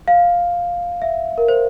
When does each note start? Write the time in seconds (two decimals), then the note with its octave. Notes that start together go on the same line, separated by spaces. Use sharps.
0.08 F5
1.02 E5
1.38 A#4
1.48 C5